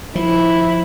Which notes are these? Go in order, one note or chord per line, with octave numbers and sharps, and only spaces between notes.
F3 E4